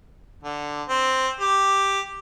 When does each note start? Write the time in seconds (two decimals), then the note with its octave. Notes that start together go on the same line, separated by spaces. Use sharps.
0.44 D3
0.88 C4
1.40 G4